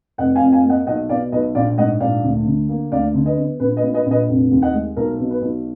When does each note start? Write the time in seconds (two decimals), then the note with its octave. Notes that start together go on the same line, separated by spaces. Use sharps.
0.18 F1 D#5 F#5
0.35 F5 G#5
0.41 F2
0.52 F5 G#5
0.64 A#3
0.70 D#5 F#5
0.87 B1 D#5 F#5
1.09 B2 D5 F5
1.32 B1 B4 D#5
1.55 A#1 D5 F5
1.78 G#2 D#5 F#5
2.00 A#1 D5 F5
2.23 D2
2.46 D3
2.69 A#3
2.92 D2 D5 F5
3.14 D3
3.26 B4 D#5
3.37 B3
3.60 A#1 B4
3.77 B4 D#5
3.83 A#2
3.94 B4 D#5
4.06 A#1
4.11 B4 D#5
4.28 F1
4.51 D#2
4.62 D#5 F#5
4.74 G#3
4.96 B1 A#4
5.19 B2
5.30 B4
5.42 B1